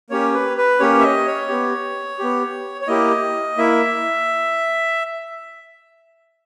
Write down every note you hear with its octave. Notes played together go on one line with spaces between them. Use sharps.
A#3 C#4 G4 C#5
B4
B4
A#3 C#4 G4 C#5
E5
D#5
C#5
B3 G4
B3 G4
C#5
A#3 E4 G4 D#5
A#3 E4 E5